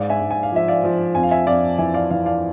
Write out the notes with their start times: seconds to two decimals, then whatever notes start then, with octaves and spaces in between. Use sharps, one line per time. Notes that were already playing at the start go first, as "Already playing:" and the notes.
Already playing: G#2 D5 F5
0.10 E5 G#5
0.21 G#2
0.31 G#5
0.43 F5
0.52 F3 E5
0.68 D5 F5
0.84 F3
1.15 F2 G#5
1.23 F5
1.31 E5 G#5
1.47 F2 D5 F5
1.78 E3 E5 G#5
1.94 D5 F5
2.10 E3 D5 F5
2.26 D5 F5